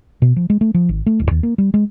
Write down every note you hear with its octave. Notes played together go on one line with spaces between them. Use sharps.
B2
F3
G#3
A3
F3
G#1
A3
D1
D#2
A#3
G3
G#3